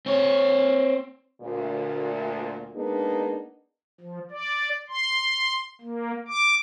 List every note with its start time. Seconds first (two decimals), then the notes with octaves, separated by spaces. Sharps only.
0.06 C4 C#5
1.41 D2 A#2
2.75 G#3 A#3 B3 D4 D#4 G#4
4.01 F3
4.31 D5
4.90 C6
5.81 A#3
6.28 D6